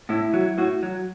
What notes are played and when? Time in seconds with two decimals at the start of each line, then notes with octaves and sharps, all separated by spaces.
0.09 A2 E4
0.34 F#3
0.58 A2 F#4
0.83 F#3